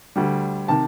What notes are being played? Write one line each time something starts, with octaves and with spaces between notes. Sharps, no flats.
D2 D3 G3
C3 D#3 A5